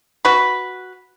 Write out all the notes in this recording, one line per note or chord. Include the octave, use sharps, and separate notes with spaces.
F#4 B4